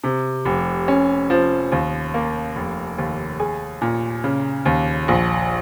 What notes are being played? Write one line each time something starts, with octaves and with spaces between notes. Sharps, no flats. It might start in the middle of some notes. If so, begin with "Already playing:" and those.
C3
F1
C#4
F3
D#2
A#3
F1
D#2
G#4
A#2
C#3
D#2
A#1